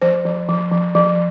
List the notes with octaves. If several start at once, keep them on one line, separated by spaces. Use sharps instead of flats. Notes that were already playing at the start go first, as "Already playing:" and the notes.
F3 C5
F3
F3
F3
F3